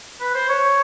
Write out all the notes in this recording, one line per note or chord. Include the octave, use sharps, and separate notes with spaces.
B4
C5
C#5